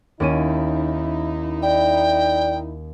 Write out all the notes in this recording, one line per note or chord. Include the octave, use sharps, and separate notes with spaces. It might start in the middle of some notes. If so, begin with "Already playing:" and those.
D#2 C#4 D#4 E4 D#7
D5 G5